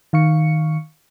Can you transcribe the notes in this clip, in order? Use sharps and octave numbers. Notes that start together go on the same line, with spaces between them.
D#3 F5 C#6 C#7